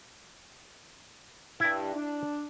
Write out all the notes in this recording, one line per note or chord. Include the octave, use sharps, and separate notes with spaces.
G2 E4 D5
D4